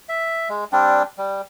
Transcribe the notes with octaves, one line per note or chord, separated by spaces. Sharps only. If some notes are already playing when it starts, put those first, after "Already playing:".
E5
G#3
G3 C4 D4
G3